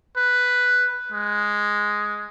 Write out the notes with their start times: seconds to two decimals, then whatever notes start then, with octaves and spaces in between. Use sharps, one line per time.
0.16 B4
1.12 G#3